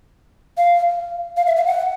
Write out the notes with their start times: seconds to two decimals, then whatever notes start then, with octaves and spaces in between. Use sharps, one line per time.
0.58 F5
1.37 F5
1.46 E5
1.56 F5
1.67 F#5